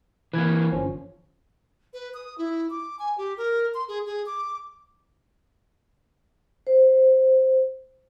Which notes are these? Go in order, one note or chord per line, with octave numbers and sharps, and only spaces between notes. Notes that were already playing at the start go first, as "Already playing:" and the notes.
E3 A#3 B4 G#6
G1 F3 C#4
B4
D#6
E4
D6
G#5
G4
A#4
C6
G#4
G#4
D6
C5